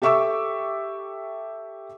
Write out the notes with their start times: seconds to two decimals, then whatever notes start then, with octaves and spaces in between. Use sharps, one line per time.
0.02 G4 A4 E5 C#6 D6 E6